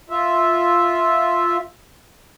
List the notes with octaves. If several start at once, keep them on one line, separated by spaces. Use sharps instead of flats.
F4 E5